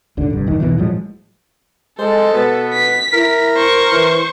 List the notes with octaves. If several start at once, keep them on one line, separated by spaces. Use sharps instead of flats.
A1 D#2 D3
F1 G2
G#1 D#2 D#3
A#1 D#2 B2 E3
A2 F3 F#3 G#3
G#3 A4 C5
B2 B3
B6
E4 A#4
C5 C#6
E3